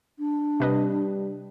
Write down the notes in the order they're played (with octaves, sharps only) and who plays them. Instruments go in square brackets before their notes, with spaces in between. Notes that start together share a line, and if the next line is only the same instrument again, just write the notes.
[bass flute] D4
[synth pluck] C3 B4 D#5 [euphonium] G3